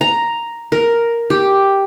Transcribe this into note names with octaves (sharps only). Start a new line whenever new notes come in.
A#5
A#4
G4